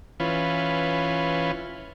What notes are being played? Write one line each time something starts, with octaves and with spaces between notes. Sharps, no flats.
E3 C#4 F4 B4